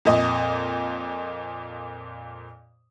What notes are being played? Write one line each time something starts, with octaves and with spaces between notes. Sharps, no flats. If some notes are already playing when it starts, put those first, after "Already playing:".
F2 A#2 D#5